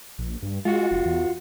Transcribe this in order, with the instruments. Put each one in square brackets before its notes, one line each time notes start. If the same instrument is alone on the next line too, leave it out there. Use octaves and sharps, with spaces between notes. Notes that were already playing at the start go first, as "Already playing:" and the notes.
[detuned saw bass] A#1
G2
[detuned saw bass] G#3 [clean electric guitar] F4 F#4
[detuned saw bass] F1
E2